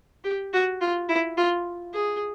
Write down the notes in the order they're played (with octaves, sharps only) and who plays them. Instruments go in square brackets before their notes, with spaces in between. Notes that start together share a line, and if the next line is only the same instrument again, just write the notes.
[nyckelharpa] G4
F#4
F4
E4
F4
G#4